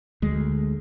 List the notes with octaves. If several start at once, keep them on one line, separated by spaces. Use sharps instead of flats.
D2 G#3